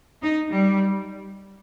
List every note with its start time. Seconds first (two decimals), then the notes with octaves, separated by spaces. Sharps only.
0.22 D#4
0.50 G3